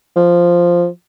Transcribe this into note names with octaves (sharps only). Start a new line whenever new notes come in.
F3